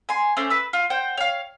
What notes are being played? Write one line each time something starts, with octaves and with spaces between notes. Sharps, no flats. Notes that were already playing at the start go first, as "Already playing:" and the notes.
G#5 C6
A3 C#4 C5 D6
B4 E6
F4
C5 F#5 G5
C#5 F5